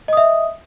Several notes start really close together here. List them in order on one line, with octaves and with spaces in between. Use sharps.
D#5 D#6 E5